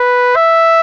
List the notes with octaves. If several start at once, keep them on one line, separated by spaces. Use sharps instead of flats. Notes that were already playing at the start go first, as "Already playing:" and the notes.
Already playing: B4
E5